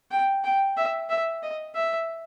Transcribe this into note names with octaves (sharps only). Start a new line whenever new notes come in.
G5
G5
E5
E5
D#5
E5